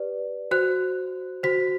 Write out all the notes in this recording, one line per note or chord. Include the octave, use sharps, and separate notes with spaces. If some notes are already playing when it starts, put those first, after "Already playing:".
Already playing: G4 B4 D5
F#4 C5 F#6
F#4 C5 B6